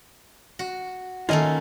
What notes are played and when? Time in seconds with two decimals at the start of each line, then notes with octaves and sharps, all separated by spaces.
0.59 F#4
1.29 D#3 A3 A#3 C#4 F4 D#5